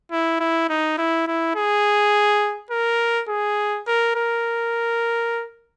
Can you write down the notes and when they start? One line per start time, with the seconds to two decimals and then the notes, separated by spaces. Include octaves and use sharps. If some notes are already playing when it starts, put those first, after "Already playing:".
0.11 E4
0.40 E4
0.69 D#4
0.98 E4
1.27 E4
1.56 G#4
2.70 A#4
3.29 G#4
3.87 A#4
4.16 A#4